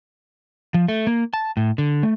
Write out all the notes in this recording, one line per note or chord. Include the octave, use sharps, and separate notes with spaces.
F3
A3
A#3
A5
A2
D3
A3